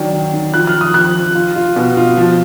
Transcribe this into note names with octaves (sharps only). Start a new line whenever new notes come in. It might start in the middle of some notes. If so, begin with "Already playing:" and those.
Already playing: D#3 F#3 D4
D#3
D#3
F3 F#6
F6
F3
D#6
F3 F#6
F3
F4
F4
B2
F4
F3